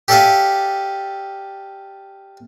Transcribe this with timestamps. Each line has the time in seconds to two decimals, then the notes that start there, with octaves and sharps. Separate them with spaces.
0.08 G4 A4 D5 E5 F5 G#5